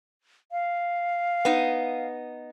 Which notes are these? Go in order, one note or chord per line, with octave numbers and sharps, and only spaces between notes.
F5
B3 D#4